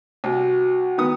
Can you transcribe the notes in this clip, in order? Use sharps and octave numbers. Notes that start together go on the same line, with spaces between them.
C2 F#4
D#3 B3 D#6